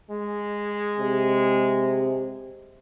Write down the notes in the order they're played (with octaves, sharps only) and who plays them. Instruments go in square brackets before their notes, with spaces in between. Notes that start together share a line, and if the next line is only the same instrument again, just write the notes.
[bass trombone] G#3
[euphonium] C3